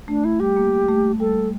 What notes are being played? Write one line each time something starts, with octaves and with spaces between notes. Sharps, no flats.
A3 D4
A3 E4
G3 G4
A#3
A3
G3 A4